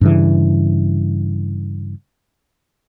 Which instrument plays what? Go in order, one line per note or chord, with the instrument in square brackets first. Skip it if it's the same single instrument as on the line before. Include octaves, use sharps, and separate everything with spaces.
[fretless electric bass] G2 C#3 E3